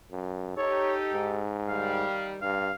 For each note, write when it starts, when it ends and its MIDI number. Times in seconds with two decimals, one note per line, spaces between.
0.12 0.53 42
0.57 1.40 63
0.57 1.40 67
0.57 1.49 69
0.57 0.95 73
1.14 2.04 44
1.68 2.46 51
1.68 2.46 55
1.68 2.26 77
2.42 2.72 43
2.42 2.75 77